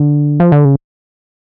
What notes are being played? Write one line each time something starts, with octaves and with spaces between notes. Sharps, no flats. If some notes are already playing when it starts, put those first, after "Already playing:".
Already playing: D3
F3
D3
C#3